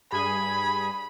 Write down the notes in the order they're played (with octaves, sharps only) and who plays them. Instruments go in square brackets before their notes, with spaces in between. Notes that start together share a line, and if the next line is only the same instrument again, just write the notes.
[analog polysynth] G2 G#4 G#5 [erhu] B5